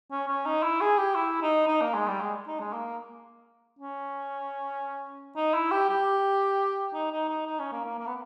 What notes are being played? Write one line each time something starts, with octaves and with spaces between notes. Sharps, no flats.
C#4
C#4
D#4
E4
G#4
G4
E4
D#4
D#4
A#3
G#3
G3
G#3
D#4
G#3
A#3
C#4
D#4
E4
G4
G4
D#4
D#4
D#4
D#4
C#4
A#3
A#3
A#3
B3